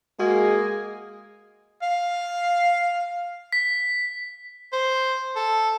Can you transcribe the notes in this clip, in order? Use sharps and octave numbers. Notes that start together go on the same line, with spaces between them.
G#3 A#3 F#4 G#4
F5
B6
C5
A4